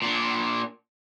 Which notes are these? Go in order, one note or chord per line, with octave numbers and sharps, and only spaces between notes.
A#2 D4